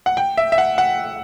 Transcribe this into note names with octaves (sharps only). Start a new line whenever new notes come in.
F#5
G5
E5
E5
F#5
F#5